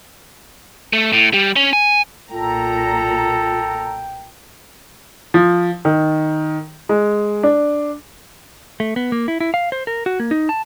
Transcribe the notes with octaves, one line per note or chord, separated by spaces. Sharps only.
A3
A2
G3
C#4
G#5
B1 A#2 F4 A4 G5 A#5
F3
D#3
G#3
D4
A3
B3
A#3
E4
E4
F5
C5
A#4
F#4
A#3
D#4
A5